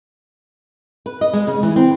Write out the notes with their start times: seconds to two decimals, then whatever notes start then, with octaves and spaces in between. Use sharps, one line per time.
1.06 B4
1.21 D#5
1.33 G#3
1.47 C#3
1.63 E3
1.76 C4